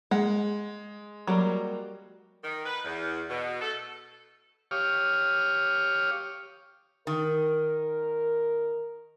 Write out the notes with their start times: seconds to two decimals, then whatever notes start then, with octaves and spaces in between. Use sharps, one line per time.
0.11 G#3 F#5
1.27 F#3 G3 A#3
2.43 D#3
2.65 B4
2.84 E2
3.30 B2
3.61 A4
4.71 G4 C#5 F5 D6 D#6 F6
7.07 D#3 A#4